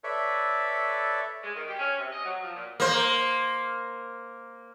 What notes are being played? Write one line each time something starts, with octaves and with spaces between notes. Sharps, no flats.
A4 B4 C#5 D5 E5
G#3
D#3
G4
C#4
C3
D#5
F#3
F3
A#2
A#3 C5